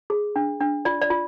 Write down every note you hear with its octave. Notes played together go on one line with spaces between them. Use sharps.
G#4
D4
D4
F4 D5
D5
F4